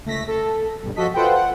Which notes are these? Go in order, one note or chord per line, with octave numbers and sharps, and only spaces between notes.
C#2 A3 A#6 B6
A4
B1 G2
F3 F#4 A4 D#5 B6
F4 A4 B4 C5 F#5 G5
F#5